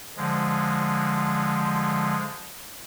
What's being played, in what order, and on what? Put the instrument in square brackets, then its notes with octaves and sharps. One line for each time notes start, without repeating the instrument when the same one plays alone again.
[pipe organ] D3 F3 G#3